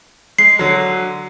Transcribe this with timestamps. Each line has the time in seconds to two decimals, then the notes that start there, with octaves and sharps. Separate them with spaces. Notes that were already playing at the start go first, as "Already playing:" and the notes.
0.38 G#3 C7
0.59 D3 F#3